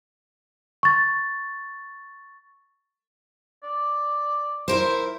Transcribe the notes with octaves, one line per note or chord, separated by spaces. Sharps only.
C#6 A6
D5
E4 A#4 C5